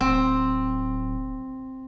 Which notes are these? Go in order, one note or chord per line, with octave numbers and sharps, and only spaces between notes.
D1 C4